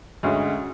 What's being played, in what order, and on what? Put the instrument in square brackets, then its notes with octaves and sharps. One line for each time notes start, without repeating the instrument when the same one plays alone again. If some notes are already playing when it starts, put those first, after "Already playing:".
[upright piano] D2 D3 G#3 C#4 F#4